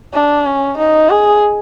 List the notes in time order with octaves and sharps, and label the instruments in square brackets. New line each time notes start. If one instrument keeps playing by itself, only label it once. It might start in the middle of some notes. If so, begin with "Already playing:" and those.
[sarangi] D4
C#4
D#4
G#4